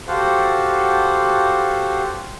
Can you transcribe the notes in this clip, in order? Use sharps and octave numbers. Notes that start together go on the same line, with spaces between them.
F#4 G4 A4 C5 F5 F#5